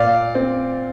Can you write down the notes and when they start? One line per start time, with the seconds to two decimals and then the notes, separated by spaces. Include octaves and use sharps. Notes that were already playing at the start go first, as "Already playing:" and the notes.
Already playing: A#2 D5 F5
0.35 C4